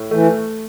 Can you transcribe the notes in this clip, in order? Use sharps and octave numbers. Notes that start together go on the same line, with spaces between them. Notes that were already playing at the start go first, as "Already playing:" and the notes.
Already playing: A2
E3 A3